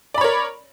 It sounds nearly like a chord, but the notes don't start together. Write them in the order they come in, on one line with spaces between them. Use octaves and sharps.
D5 B5 C#5 A#4